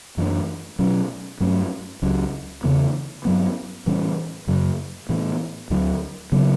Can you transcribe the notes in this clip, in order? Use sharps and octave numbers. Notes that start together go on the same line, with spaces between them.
F#2 E3 A3 D4
B2 F#3 C#4
G2 F#3 A3 C#4
C#2 C#3 F#3
E2 C#3 E3 B3
G2 F#3 B3
A2 E3 G3 C#4
F#2 C#3 F#3
A2 E3 B3
D2 D3 F#3
C#3 F#3 B3